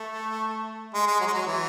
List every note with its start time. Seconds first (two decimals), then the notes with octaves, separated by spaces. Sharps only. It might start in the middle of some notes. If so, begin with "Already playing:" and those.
Already playing: A3
0.94 G#3
1.07 G#3
1.20 F#3
1.27 G#3
1.33 F#3
1.47 E3